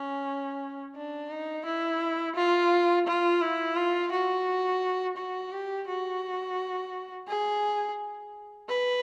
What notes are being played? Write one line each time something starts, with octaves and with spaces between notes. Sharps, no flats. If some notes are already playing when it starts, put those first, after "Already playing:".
Already playing: C#4
D4
D#4
E4
F4
F4
E4
F4
F#4
F#4
G4
F#4
G#4
B4